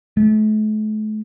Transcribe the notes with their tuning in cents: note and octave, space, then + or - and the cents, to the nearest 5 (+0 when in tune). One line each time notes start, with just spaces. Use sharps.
A3 -40